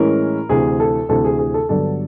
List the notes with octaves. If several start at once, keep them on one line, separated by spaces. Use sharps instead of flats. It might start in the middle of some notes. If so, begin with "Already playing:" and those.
Already playing: A2 E3 G#3 C#4 A#4
D2 C3 E3 G#4
A4
D2 C3 E3 A4
G#4
G#4
A4
G2 D3 F#3 B3 D4 A4